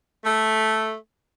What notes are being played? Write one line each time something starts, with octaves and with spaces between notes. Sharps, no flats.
A3